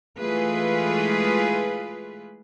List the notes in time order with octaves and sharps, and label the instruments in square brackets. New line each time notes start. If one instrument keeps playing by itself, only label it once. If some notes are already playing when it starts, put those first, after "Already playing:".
[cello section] E3 G#3 A3 F4 G#4 B4